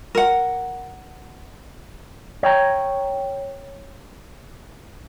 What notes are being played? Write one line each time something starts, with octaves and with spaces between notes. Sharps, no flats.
A#4 F#5
C#5 G5 A#5